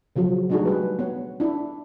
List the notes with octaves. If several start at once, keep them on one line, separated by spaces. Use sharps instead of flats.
C#3 F3 F#3 F#4 G#4
G#3 A3 D4 D#4 F#4 G#4
G3 B4
B3 C#5
D4 E4